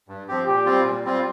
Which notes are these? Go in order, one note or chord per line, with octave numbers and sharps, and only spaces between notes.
G2
F3 C4 G4
A#2 G4
G3 C4 F4
A#2
G3 C4 F4